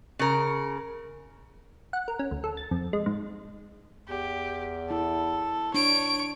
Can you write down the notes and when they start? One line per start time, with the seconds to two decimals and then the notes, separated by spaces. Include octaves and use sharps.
0.19 C#3 A#4
1.93 F#5
2.08 A#4
2.19 C#4
2.31 D2
2.44 A4
2.57 A6
2.71 F2
2.93 G#3
3.06 G#2
4.09 E2 G4
4.91 E4 A4
5.74 D4 C#5 D7